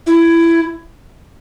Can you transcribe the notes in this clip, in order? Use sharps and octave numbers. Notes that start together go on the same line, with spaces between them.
E4